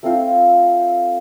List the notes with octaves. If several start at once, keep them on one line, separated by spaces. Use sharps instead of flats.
A3 C4 F4